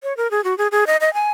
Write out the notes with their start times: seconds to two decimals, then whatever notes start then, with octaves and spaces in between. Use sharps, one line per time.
0.03 C#5
0.17 A#4
0.31 G#4
0.44 F#4
0.58 G#4
0.72 G#4
0.87 D#5
1.01 D#5
1.14 G#5